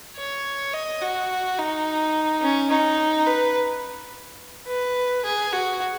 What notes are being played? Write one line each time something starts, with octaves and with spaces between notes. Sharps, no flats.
C#5
D#5
F#4
D#4
C#4
D#4
B4
B4
G#4
F#4